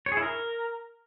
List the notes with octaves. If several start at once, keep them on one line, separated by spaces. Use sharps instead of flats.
C#5
G#4
E4
A#4